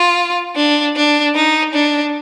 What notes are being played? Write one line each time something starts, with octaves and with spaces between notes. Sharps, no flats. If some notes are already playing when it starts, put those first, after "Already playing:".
Already playing: F4
D4
D4
D#4
D4